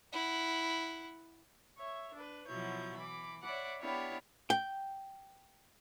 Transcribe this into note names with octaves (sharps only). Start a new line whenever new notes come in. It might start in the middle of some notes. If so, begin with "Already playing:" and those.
E4 F#5
C#5 E5
D4 B4
B2 F3 F#3 E4 C#5 G6
E3 B5 D6
C#5 D5 E5 F#5 B5 D6
B3 D4 E4 G4 C#5 F5
G5